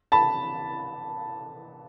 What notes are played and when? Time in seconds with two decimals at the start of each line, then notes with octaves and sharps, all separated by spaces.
0.12 A5 B5